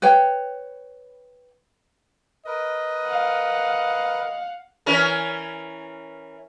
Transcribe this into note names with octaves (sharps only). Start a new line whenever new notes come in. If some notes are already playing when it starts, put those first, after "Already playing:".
B4 C#5 G5
A#4 B4 D#5
F5 F#5
E3 C#4 A#4